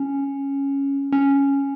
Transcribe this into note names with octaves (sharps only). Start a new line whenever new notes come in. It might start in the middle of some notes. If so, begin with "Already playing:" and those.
Already playing: C#4
C#4